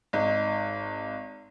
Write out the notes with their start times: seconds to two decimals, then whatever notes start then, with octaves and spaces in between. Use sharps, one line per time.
0.13 G#1 D#4